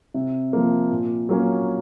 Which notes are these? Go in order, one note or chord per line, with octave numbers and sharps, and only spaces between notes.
C3
F3 A#3
A#2
F#3 A#3 C#4